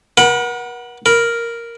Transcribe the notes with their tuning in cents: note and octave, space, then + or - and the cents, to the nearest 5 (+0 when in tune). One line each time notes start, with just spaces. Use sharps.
A#4 +45 F#5 +0 B5 +0
A#4 +0 B5 -15